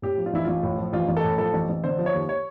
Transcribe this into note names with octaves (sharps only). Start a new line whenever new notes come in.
A2 G4
F3
F4
A1 E4
A1 F4
A2
F3
A1 F4
A1
A4
A2
F3 A4
A1
A1
D3 C5
F3
C#5
D#2
C#5